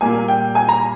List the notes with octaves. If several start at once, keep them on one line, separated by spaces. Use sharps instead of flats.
A#2 G3 A#3 G#5
G5
G#5
A#5